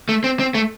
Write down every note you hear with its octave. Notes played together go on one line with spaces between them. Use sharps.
A3
C4
C4
A3